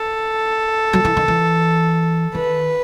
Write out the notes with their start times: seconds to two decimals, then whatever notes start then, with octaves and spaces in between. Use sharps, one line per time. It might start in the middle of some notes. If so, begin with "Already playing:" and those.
Already playing: A4
0.93 F#3
1.05 E3
1.17 D#3
1.28 E3
2.35 D#3 B4